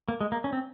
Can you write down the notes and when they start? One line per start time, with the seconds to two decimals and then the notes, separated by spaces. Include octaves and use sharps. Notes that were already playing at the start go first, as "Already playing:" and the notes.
0.08 A#3
0.21 G#3
0.32 A#3
0.44 C#4
0.53 C4